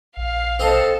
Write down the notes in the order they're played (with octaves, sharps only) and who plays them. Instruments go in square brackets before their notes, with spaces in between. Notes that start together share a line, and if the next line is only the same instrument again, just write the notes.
[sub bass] A#1 [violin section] F5
[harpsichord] C4 D#5 [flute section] A4